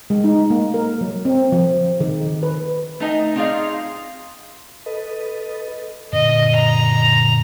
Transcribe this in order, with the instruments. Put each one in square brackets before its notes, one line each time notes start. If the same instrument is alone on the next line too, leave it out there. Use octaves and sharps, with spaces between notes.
[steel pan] G#3
D#4
A#3
A#4
F#3
C4
F3
D#3
B4
[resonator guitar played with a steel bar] A3 D#4 D#5 G#5
C4 D#4 F4 G#4 D5 F5
[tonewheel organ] A4 B4 D#5
[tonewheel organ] F#2 A#2 D3 [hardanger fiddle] D#5
[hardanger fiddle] A#5